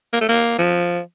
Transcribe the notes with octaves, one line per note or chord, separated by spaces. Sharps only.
A#3
A3
A#3
F3